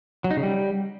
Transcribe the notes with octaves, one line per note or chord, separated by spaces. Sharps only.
F#3
D#4
C#3
G3